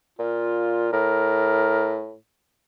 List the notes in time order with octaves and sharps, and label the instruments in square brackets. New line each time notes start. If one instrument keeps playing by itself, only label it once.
[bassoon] A#2 [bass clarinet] F4
[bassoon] A2 [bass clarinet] A#4